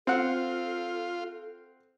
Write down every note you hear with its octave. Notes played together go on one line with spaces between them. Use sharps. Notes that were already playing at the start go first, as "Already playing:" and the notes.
C4 F4 A4 F#5